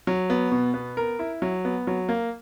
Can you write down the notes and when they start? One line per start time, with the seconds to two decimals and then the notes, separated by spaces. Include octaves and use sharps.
0.07 F#3
0.30 B3
0.51 B2
0.74 B3
0.97 A#4
1.19 E4
1.42 F#3
1.65 B3
1.87 F#3
2.09 A#3